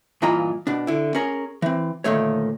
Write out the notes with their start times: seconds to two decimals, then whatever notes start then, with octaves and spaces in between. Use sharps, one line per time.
0.22 G2 A#2 E3 F4 D#5 A#5
0.67 B2 D4
0.87 D3 E4
1.15 C#4 G#4 A#4
1.62 E3 C4
2.04 D2 A#2 D#3 A3 C#5